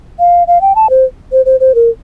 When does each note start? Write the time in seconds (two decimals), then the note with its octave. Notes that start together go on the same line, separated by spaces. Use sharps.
0.19 F5
0.47 F5
0.61 G5
0.75 A5
0.90 C5
1.32 C5
1.46 C5
1.60 C5
1.75 A#4